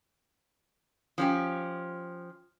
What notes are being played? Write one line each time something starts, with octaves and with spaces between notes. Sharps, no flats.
F3 C#4 G4